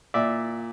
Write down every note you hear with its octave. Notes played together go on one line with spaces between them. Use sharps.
A#2 D5 E5